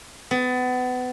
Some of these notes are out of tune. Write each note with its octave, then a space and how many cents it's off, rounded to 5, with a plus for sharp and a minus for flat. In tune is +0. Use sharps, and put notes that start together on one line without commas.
B3 +30